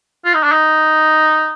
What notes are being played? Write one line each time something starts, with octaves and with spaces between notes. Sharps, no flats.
F4
D#4
D4
D#4